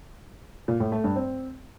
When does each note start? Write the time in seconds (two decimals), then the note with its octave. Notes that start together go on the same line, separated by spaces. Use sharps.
0.68 A#2
0.80 A2
0.92 A3
1.04 G2
1.16 C4